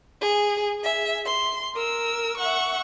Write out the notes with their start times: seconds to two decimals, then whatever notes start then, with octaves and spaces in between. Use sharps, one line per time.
0.22 G#4
0.80 G#4 E5
1.26 C6
1.75 A#4 E6
2.37 E5 F#5 C#6